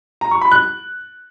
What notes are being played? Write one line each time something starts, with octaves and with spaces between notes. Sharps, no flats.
A#5
C#6
B5
F#6